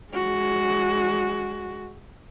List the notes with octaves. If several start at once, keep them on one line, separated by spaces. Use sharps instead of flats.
G#3 F#4